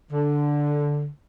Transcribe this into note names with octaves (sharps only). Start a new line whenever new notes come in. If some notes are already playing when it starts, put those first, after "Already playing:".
D3